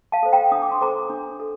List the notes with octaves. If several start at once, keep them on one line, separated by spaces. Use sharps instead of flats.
F5 A5
A4 C5
G5 A#5
D4 D#6
D6
C6
A4 C5 A#5 D6
D4
A4